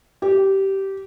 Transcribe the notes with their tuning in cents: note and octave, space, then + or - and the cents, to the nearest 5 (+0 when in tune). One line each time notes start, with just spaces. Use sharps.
G4 -15